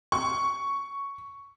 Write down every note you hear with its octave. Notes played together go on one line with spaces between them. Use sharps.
C#6